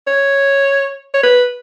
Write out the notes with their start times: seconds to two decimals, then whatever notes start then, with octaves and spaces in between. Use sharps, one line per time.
0.07 C#5
1.14 C#5
1.23 B4